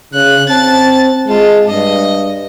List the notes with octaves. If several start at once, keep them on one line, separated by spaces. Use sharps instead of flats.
C#3 F#6
C4 A5 A6
G#3 F4 A5
G2 D#5